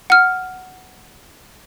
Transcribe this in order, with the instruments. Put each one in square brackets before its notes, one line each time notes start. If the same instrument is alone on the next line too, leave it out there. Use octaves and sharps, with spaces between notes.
[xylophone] F#5 F6